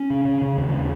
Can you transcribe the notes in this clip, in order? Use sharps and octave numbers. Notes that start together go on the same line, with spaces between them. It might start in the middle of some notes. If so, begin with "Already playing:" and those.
Already playing: C#4
C#3
C#3
C#3
D#2
C#3